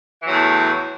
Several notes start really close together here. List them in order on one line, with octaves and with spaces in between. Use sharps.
E3 F#3 E2 A2